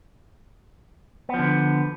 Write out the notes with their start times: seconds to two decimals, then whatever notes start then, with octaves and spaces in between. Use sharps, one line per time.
1.29 B3
1.34 F3
1.39 D3